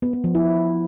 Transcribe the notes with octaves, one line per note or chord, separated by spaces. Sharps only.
B3
B3
F3
E4